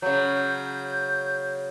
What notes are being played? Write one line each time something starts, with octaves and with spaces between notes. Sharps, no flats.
C#3 F#3 G6